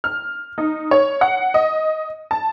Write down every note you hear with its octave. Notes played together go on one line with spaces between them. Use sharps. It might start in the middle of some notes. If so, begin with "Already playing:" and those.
F6
D#4
C#5
F#5
D#5
A5